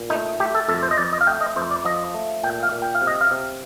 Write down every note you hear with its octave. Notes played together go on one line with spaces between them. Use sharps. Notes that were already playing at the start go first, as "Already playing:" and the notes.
Already playing: A#2
A3 D#4
A3 G4
A4
F2 A4
C5
D#5
F2 D5
D#5
F5
A3 G5
D#5
F2 C5
D5
F3 D#5
A3
A#2 G5
F5
A#2
G5
F5
C3
D#5
F5
C3